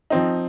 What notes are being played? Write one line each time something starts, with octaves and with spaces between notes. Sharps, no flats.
F3 C4 D#4